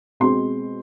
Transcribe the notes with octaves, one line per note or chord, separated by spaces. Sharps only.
B2 G#3 C4 C6